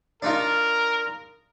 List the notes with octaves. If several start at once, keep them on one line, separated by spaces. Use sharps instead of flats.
D4 D#4 F4 A#4